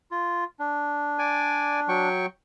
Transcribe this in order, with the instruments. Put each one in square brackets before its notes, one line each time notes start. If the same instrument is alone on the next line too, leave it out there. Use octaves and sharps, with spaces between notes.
[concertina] F4
D4
[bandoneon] D5 G#5
F#3 G5 C#6